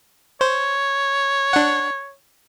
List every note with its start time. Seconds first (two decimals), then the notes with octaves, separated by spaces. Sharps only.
0.41 C5 C#5
1.53 D4 F#5